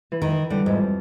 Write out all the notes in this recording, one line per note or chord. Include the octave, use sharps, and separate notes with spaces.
E3
D#3
E3
D3 G3
F2 G#2